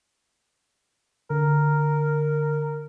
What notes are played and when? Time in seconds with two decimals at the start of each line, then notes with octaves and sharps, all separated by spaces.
1.30 D3 A#4